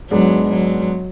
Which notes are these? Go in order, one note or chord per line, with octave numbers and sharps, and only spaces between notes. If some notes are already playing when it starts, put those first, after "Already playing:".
G#2 F#3 G#3 B3 D4
F#3